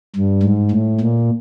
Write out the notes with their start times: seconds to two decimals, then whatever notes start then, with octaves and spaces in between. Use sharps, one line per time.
0.16 G2
0.43 G#2
0.71 A2
1.01 A#2